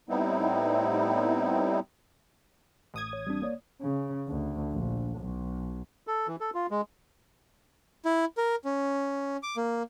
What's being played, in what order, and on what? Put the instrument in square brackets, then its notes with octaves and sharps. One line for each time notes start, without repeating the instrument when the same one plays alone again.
[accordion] A2 G3 B3 C4 D#4 E4
[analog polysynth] A1 D#6 G#6
[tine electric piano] C#5
G3 C4 D4
A#3 C#5 D5
[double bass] C#3
D2
A#1
B1
[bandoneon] A4
E3
A4
F4
G#3
[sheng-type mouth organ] E4
A#4
C#4
D6
A#3